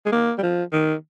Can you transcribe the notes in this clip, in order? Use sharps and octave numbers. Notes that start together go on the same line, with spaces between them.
G#3
A#3
G3
F3
D#3